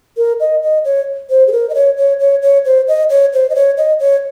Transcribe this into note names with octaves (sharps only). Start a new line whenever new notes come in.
A#4
D#5
D#5
C#5
C5
G#4
A#4
D#5
C#5
C#5
C#5
C#5
C5
D#5
C#5
C5
D#5
C#5
D#5
C#5